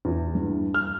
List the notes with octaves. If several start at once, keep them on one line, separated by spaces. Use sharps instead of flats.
E2
G2
F6